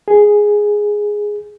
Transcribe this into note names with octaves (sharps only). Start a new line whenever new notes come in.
G#4